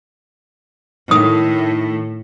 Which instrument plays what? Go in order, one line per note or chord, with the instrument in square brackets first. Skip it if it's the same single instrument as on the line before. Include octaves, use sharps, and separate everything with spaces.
[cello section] A2 [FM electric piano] D#3 [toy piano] D#6